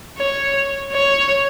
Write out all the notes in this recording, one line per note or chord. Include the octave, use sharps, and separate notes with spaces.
C#5
C#5